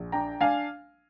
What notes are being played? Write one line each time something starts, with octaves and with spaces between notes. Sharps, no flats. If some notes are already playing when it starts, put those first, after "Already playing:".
Already playing: A#1
D4 G5 A#5
D4 F5 G#5